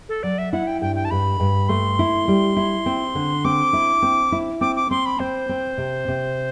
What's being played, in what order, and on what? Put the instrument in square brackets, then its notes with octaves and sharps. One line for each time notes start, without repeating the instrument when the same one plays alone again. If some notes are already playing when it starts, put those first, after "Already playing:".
[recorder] A4
[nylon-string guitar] F#3 [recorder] D5
[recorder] E5
[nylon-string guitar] E4 [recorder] F#5
[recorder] G5
[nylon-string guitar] G2 [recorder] G5
[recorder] G5
A5
[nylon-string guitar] G2 [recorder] B5
[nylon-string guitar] G2
[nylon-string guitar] A3 [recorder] C6
[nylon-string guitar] E4
G3
E4
C4
D3
[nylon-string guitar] C4 [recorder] D6
[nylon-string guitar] E4
C4
E4
[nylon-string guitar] C4 [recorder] D6
[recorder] D6
[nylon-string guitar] C4 [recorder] C6
[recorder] B5
[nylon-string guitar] C4 [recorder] C5
[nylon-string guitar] C4
C3
C3